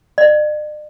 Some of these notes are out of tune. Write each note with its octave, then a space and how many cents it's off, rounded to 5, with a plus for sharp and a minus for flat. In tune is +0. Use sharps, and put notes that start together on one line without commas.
D5 +45